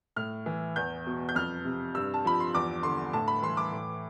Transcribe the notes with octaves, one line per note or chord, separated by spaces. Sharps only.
A2 F6
E3
E2 G6
B2
G6
F2 F6
C3
G2 E6
A5
F3 B5
C6
E2 D6
D3 C6
A2 A5
B5
E3 C6
D6
A2